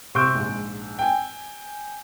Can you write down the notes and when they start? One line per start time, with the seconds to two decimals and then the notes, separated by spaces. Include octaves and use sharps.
0.15 C3 C6 C#6 E6 G6 D7
0.34 A#1 G#2
0.99 G5 G#5